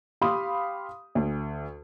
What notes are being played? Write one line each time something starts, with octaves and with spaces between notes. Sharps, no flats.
G4 F5 B5 C6 D#6
D2